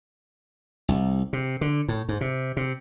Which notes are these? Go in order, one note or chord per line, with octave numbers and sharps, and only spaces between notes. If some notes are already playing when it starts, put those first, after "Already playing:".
C2
C3
D3
A2
G#2
C3
C3